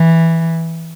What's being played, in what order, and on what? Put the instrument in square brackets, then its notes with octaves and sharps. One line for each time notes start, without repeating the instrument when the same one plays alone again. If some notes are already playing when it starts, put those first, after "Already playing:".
Already playing: [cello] E3